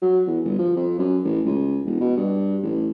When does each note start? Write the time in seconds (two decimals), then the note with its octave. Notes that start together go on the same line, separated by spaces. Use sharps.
0.02 F#3
0.27 E2
0.45 G1
0.58 F3
0.76 F2
0.98 F#2
1.25 A1
1.46 C#2
1.85 E1
2.00 B2
2.17 G2
2.63 A1